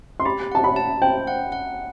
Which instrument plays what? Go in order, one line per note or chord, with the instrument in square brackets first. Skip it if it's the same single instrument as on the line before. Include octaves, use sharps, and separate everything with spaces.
[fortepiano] C6
[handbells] G4 [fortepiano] B5
[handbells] F#5 [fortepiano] A5
[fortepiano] B5
[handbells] A5
[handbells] C5 [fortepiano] G5
[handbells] F#5
F#5